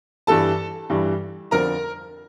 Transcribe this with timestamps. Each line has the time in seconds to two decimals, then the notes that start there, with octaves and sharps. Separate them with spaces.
0.27 G2 E3 G3 A4 A5
0.90 G2 E3 G3
1.51 F2 D3 F3 A#4 A#5